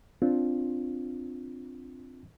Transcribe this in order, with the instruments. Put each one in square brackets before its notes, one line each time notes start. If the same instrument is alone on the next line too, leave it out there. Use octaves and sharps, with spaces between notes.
[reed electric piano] C4 D4 F4